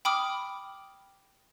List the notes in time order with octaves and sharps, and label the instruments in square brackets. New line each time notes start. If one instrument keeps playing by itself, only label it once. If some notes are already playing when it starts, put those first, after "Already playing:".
[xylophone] G5 B5 D6 D#6 F6